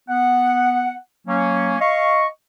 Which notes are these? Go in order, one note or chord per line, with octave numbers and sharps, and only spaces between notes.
B3 F#5
F#3 A#3 C#4
D#5 F5 C#6